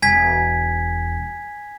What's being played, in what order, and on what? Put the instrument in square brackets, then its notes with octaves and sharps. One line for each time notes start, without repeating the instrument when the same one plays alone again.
[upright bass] E1 [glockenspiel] G#5 G#6 B6